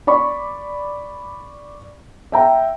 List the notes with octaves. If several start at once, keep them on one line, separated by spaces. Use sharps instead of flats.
D5 B5 C#6
E5 G5 A#5